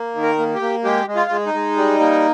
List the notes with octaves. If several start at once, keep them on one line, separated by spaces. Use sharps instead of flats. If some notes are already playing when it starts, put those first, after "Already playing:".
Already playing: A#3
D#3
A#4
A#3
G4
A#3
G#3 G4
G#3
F4
G#3
D#4
G#3
G3
A#3